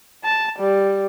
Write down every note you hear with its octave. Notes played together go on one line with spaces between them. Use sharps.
A5
G3